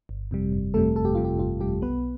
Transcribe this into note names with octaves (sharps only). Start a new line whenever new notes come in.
G1
F2 C3 G3
G1
F2 C3 G3 A3 A4
G1 A4
G4
F2 C3 G3 F4
G4
G1 F4
F2 C3 G3 G4
B1 B3 B4